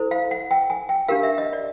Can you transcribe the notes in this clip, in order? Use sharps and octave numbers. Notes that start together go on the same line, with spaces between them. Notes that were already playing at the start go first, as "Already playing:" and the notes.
Already playing: E4 A4 C5
F5
F#5
G5
G#5
G5
D4 G4 A#4 F5
E5
D#5
D5